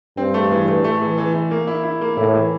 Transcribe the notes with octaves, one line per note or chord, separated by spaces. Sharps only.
G2 C4
A3
E3
A3
A3
E3
E3
E3
A#3
E4
E4
A#3
A2 E4
E3